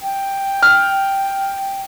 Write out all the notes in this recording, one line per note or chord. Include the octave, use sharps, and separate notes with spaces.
G5
F6